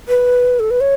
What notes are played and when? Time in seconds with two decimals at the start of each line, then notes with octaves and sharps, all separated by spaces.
0.08 B4
0.60 A4
0.71 B4
0.81 C#5